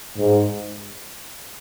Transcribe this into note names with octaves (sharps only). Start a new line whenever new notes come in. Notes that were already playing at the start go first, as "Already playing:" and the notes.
G#2